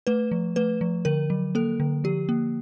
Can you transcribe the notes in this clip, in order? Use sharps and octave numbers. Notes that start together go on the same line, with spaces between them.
A3 B4
F3
A3 B4
F3
D3 A#4
F#3
A#3 A4
D3
F3 G4
A#3